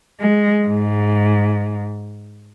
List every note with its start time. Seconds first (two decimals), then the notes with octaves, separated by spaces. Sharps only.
0.20 G#3
0.67 G#2